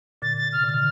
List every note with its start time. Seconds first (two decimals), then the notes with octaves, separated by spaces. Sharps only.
0.22 A#2 D3 A6
0.38 A6
0.53 C3 F6
0.64 A#2 D3
0.69 F6
0.74 C3 D#3